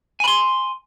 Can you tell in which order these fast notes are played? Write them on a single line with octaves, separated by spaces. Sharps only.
G#5 B5 C6